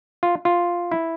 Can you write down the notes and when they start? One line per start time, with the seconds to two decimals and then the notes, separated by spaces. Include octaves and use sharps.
0.23 F4
0.45 F4
0.91 E4